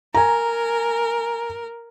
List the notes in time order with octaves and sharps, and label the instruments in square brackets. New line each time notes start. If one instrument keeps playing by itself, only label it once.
[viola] A#4 [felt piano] G#5 A#5